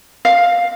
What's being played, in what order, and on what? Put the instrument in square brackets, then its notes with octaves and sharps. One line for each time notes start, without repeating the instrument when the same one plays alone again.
[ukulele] F5